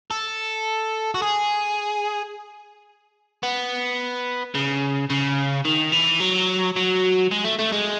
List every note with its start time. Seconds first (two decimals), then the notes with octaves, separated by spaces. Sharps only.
0.11 A4
1.14 F#4
1.22 G#4
3.43 B3
4.55 C#3
5.10 C#3
5.65 D#3
5.92 E3
6.20 F#3
6.76 F#3
7.31 G#3
7.44 A3
7.59 A3
7.72 G#3